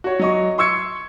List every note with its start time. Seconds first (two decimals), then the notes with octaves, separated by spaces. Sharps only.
0.04 F#4 C#5
0.19 F#3 D#5 C#6
0.58 C6 C#6 E6 G#6 C#7